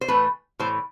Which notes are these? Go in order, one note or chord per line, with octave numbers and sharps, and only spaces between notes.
C5
A2 E3 A3 B4
A2 E3 A3 C5